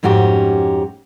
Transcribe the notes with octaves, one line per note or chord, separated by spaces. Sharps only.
F2 G#2 C#4 F#4 G4